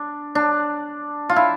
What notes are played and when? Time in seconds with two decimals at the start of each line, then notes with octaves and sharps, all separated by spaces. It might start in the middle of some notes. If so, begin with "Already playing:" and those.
Already playing: D4
0.35 D4
1.29 F4
1.36 E4